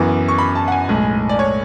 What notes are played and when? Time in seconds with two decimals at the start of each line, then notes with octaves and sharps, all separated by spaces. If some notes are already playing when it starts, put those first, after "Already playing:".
Already playing: F#2 E3 B3 D6
0.28 C#6
0.38 B5
0.55 A5
0.68 F#5
0.72 G#5
0.89 B1 A2 G#3
1.29 D5
1.39 C#5